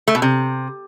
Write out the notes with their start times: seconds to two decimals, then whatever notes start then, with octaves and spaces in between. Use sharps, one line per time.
0.08 A3
0.15 B2
0.22 C3